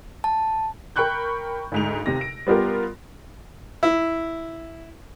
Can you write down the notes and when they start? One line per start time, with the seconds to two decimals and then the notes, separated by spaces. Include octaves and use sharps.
0.24 A5
0.96 A#4 G5 B5 C#6 F#6 G6
1.72 D2 G#2 F7
2.06 D#2 C3 A#6
2.21 D7
2.47 G3 B3 F4 G4 A#4
3.83 E4